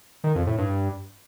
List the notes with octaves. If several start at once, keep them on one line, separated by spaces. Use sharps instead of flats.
D#3
F2
A2
G2